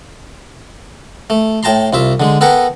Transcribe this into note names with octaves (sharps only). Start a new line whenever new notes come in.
A3
A2 G5 A5 A#5 C6
C2 F4 E5
D3 G#3
B3 A4 A#4 F#5 G5